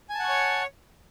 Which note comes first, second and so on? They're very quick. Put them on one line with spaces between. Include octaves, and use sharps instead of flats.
G#5 A5 F#5 C#6 C#5